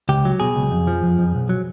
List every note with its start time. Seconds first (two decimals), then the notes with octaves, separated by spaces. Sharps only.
0.09 C#2 G4
0.25 F#3
0.40 B2 G#4
0.56 C#2
0.71 F2
0.87 F3
1.03 F2
1.19 F2
1.35 B1
1.49 F#3